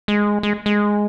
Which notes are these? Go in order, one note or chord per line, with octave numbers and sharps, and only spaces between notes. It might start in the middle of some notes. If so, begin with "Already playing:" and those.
G#3
G#3
G#3